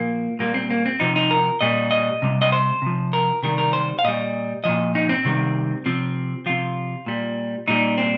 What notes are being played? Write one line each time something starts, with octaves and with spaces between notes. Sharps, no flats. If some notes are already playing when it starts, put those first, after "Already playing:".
Already playing: A#2 F3 A#3
A#2 G3 A#3
C4
A#3
C4
C3 F3 D#4
D#4
A#4
A#2 G3 D#5
D#5
C3 G3
D#5
C5
C3 F3
A#4
C3 D#3 G3 A#4
A#4
C5
F5
A#2 G3 D#5
A#2 F3 D#5
D#4
C4
C3 D#3 G3
C3 F3 C4
C3 F3 F4
A#2 G3
A#2 G3 D#4
C4